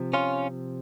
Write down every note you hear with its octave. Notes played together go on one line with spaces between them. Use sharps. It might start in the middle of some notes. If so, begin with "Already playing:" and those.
Already playing: C3 F3
C#4 F4